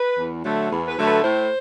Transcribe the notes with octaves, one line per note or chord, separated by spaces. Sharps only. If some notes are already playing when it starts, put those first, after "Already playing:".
Already playing: B4
E2
D3 F#3 A3
E2
B4
D3 F#3 A3
B4
A2 C5